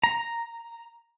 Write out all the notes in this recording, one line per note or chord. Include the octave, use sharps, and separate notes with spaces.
A#5